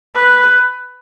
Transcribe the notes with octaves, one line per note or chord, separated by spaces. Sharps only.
B4